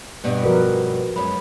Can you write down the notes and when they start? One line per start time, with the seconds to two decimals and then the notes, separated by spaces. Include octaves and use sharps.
0.24 G2 B2
0.44 F3 F#4 A#4 B4
1.16 F#2 G#3 B5